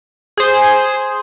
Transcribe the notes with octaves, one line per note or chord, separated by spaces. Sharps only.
G#4 C5